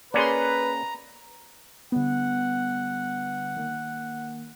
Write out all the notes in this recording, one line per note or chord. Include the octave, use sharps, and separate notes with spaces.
A#3 C#4 G#4 B4 D5 A#5 C6
D3 G3 B3 F#5
D#3 A#3